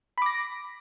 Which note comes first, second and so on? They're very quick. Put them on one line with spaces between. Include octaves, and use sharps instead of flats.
B5 D6 A#6